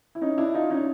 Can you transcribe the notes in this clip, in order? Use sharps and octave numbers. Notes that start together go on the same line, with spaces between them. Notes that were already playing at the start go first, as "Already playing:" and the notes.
E4
C#4 D#4
D4 E4
D#4 F4
C#4 D#4